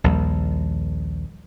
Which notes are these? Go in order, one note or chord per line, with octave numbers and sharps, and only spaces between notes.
A#1 D#2 G3